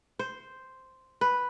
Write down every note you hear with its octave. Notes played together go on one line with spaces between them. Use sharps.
C5
B4